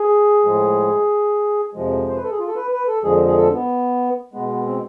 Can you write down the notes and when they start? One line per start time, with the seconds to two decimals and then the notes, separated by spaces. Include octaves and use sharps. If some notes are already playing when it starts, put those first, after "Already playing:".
Already playing: G#4
0.45 A2 F3 G#3
1.74 F2 C3 F3 G#3
2.08 C5
2.16 B4
2.23 A4
2.31 G#4
2.39 F4
2.47 A4
2.56 B4
2.72 B4
2.88 A4
3.03 F2 D3 F3 G#3 G#4
3.28 G#4
3.37 A4
3.53 B3
4.34 B2 G#3 B3
4.49 B3
4.66 C4